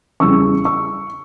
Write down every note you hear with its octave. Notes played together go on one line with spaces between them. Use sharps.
E2 C#3 E3 G3 C#6 E6
C#6 E6